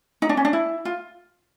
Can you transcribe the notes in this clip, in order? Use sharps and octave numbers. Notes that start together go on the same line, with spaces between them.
D#4
D4
C#4
D4
E4
F4